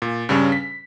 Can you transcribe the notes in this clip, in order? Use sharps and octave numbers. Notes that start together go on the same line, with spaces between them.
A#2
G2 C#3 G3 C#4
B6